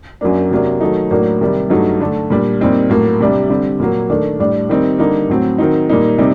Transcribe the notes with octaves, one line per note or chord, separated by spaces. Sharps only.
F#2 F#3 A#3 D4
C3 F#3 A#3 D4
D#3 F#3 A3 D#4
A2 F#3 A#3 D4
C3 D#3 G3
G2 F#3 A3 D#4
D3 A3 D4
A#2 G3 D4
A#2 G3 C4 D#4
A2 F#3 A#3
C3 G3 D4
D3 G3 C4
A#2 F#3 A#3
D#3 A3 D4
A2 G3 D4
D#3 G3 C4 D#4
D3 G3 A#3 D#4
A2 F#3 C4
D#3 F#3 C4 D#4
A#2 G3 A#3 D#4
C3 G3 C4 D#4